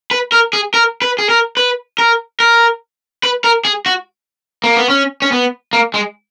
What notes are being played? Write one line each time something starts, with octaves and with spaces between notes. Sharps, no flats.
B4
A#4
G#4
A#4
B4
G#4
A#4
B4
A#4
A#4
B4
A#4
G#4
F#4
A#3
B3
C#4
C#4
B3
A#3
G#3